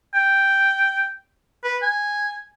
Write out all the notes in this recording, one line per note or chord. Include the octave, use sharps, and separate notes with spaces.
G5
B4
G#5